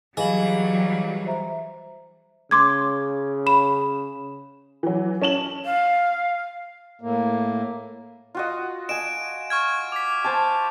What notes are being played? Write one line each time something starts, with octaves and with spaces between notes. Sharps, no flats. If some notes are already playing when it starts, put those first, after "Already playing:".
E3 F#3 G3 G#4 D#5 F5 F#7
C5 E5 A#5
C#3 C6 D6 G#6
B5 E7
E3 F#3
C#4 A5 E7 F#7
F5
A2 A#3
F4 F#4 D#5
D#5 G#5 D7 E7
C#6 F6 G#6
D6 B6
C5 G#5 A5